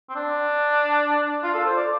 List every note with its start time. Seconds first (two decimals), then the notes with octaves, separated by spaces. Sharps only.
0.09 C4
0.16 D4
1.43 F4
1.54 A4
1.66 C5
1.77 D5